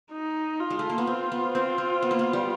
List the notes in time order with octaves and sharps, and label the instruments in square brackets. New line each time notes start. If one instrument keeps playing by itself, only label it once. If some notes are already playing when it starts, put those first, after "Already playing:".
[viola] D#4
F4
[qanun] G#3
A3
A#3
B3
C4
B3
C4
C4
B3
A#3
B3
G3